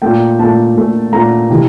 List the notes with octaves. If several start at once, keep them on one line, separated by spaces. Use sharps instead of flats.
A#2 A3 G5
A#2 A3 A5
A#2 A3
A#2 A3 A#5
C3 E3